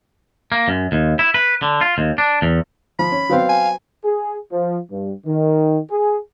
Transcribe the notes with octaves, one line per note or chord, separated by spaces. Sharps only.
A#3
F#2
D#2
E4
B4
D3
F4
D#2
D4
E2
F3 B5
C#4
F#3 B3 C4 F5
G#5
G#4
F3
G2
D#3
G#4